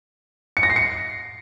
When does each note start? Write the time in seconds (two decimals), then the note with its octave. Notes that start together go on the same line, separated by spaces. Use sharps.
0.57 C#7
0.63 A#6
0.70 C7
0.76 C#7